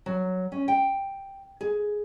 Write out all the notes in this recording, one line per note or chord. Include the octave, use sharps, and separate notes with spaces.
F#3
C#4
G5
G#4